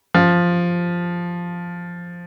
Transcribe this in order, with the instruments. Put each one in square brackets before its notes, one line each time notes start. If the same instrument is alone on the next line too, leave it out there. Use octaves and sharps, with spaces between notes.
[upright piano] F3